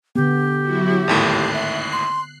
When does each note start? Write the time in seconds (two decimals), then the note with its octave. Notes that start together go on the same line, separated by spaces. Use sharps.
0.16 D3 B3 G4
0.63 F#3 E4 F#4
1.08 G#1 D#2 A2 F#6 C7
1.53 E5
1.92 C6